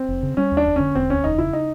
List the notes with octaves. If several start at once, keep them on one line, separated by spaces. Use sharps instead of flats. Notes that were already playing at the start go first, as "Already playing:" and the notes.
Already playing: C4
F1
C#3
G3 C#4
D#2
D4
F1
D3 C#4
E1 C4
D2 C#4
E1 D#4
C#3 E4
D#4